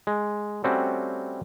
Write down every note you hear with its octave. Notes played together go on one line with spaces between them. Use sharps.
G#3
G3 A3 C4 C#4 F#4